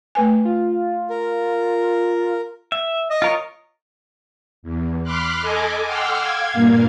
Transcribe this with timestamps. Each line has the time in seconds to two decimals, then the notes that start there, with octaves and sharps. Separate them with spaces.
0.15 A3 B4 G#5
0.45 F4
1.10 A#4
2.72 E5
3.10 D#5
3.22 F4 A#4 C#5
4.63 E2
5.03 B5 C6 D6 F6 F#6
5.40 A4 D#5 G#5 D6
5.85 F#5 G5 C6 D6 E6 F6
6.18 F5 G#6
6.53 G2 A#2 A#3